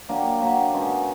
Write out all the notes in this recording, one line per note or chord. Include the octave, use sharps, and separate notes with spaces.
F#3 A#3 D4 G4
F#3 A#3 D4 G4
B2 G#3 C#4